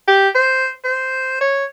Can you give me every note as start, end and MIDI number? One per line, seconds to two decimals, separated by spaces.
0.08 0.28 67
0.35 0.69 72
0.84 1.40 72
1.41 1.65 73